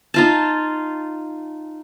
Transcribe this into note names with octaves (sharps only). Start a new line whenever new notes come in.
D#4 F4 A5